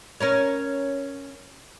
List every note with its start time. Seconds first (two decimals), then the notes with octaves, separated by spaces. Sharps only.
0.20 C#4 A#4 C#5